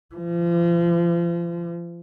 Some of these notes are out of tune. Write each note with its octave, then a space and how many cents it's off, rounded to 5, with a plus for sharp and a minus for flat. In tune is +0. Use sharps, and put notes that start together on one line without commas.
F3 -35